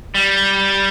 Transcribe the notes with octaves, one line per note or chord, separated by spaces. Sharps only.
G3